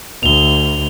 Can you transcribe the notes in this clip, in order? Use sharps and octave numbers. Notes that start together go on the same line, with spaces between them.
D2 F7 G7